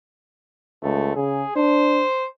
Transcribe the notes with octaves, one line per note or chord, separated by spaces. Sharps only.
C#2 A3
C#3 G#4
D4 C5